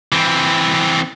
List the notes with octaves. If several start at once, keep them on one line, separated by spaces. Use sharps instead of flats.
E3 C4